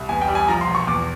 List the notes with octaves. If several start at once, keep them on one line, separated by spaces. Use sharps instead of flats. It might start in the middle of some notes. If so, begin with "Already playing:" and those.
Already playing: C2
E2 G#5
G5
G3
G#5
F3 A#5
C6
E1
C#6
E2 D6